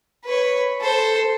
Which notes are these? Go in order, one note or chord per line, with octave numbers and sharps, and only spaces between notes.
B4 C#5
A4 C5